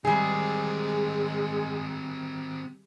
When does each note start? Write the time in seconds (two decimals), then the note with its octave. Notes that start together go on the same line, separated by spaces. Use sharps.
0.05 D#3 G3 G#3 C4 G#4